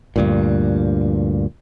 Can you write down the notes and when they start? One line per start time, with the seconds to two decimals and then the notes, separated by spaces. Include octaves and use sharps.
0.16 D2 G2 A#2